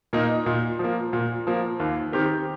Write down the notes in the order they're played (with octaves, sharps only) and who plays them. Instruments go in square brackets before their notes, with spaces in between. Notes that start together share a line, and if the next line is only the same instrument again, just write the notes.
[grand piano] A#2 A#3 D#4
A#2
F3
A#3
A#2
F3 A#3
D#2
D#3 C4 G4 A#4